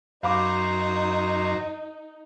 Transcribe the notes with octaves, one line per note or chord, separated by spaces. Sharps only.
F#2 D#4 C5 F5 A#5 B5 D6